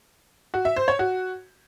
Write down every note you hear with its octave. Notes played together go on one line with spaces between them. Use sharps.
F#4
E5
C5
C#5
F#4